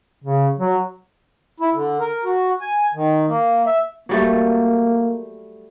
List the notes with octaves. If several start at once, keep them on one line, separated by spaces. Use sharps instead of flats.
C#3
F#3
E4
D3
A#4
F#4
G#5
D#3
A#3
E5
F#3 G3 A3 A#3